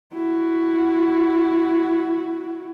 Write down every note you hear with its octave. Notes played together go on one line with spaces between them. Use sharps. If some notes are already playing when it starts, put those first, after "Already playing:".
E4 F#4